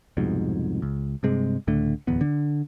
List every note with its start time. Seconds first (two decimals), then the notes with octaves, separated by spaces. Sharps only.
0.17 C2 F2 G#2 B2
0.82 C#2
1.23 G2 C3 G#3
1.67 C#2 A2 D3 A3
2.07 D1 E2 B3
2.21 D3